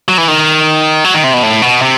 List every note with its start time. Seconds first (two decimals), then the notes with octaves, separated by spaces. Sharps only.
0.09 F#3
0.18 E3
0.28 D#3
1.05 F#3
1.14 D#3
1.24 C3
1.33 B2
1.43 A2
1.62 B2
1.82 C3